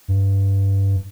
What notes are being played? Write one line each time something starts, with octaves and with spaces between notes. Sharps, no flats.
G2